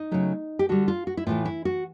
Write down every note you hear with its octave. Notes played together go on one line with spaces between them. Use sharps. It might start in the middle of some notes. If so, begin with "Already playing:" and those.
Already playing: D#4
C#3 F#3 A3
G4
D3 G3 F#4
F4
F#4
E4
A2 E3 A3 F4
E4
F#4